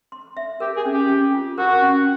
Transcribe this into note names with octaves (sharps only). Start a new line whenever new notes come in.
C6
E5
G4 A#4
G#4
C#4
G4
C#4
F4
F#4 A#4
C#4